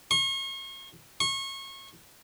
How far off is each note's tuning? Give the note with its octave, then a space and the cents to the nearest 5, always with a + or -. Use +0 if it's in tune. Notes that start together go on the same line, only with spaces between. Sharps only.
C#6 -40
C#6 -30